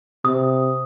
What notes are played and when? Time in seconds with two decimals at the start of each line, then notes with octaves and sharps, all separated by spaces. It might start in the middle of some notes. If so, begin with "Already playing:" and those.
0.25 C3 D#6